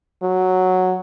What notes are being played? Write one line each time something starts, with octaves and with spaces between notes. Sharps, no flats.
F#3